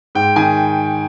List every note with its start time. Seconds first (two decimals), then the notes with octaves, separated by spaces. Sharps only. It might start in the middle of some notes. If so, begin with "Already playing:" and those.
0.15 G#2 G5
0.36 D#3 G#5